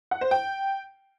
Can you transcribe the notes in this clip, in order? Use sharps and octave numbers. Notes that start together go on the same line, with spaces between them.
F#5
C5
G5